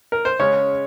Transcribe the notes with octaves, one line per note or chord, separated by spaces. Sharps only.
A#4
C5
C#3 G#3 C#4 C#5